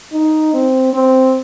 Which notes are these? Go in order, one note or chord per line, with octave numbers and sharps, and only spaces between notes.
D#4
C4
C4